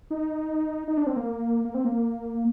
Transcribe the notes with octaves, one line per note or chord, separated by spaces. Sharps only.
D#4
D#4
D4
C4
A#3
A#3
C4
A#3